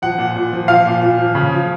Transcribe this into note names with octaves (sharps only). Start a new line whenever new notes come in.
F3 F#5
A#2
A#2
F3
F3 F5
A#2
A#2
F3
C#3
F3